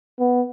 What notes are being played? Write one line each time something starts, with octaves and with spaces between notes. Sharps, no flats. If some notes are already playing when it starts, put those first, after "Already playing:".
B3